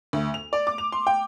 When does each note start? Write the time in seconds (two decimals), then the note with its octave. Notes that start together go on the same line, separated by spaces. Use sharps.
0.13 D2
0.34 F7
0.53 D5
0.67 D6
0.78 F7
0.92 C6
1.07 G5